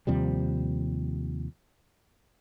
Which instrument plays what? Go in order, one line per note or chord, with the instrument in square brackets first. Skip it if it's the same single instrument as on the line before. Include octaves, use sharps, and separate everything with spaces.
[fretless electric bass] D#2 C3 F3 G3